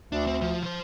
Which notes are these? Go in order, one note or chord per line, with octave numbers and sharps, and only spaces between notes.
D2 D4
C4
F3
F3 C5